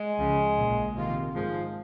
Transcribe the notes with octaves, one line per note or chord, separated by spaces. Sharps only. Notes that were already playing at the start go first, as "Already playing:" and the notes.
Already playing: G#3
C#2 C#3 F3
A#1 A#2 F3
C3 D#3 A#3 F4
G#2 D#3 F3 G#3